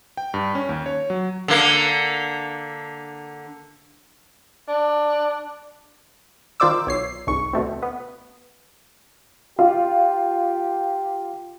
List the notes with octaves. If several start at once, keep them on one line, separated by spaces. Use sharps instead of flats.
G5
G2
C#4
D#2
C#5
F#3
D3 A#3
D4
D#3 F4 C5 D5 D6 E6
B1 C#5 C7
G1 C2 G#2 C#6
D2 B2 A3 C4
B3
F4 G4